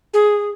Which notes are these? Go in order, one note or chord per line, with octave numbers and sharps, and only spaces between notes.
G#4